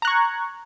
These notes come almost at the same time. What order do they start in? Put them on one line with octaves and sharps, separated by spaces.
A#5 F#6 C#6 G#6